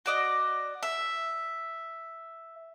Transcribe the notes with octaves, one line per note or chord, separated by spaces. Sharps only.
F#4 D5 D#5
E5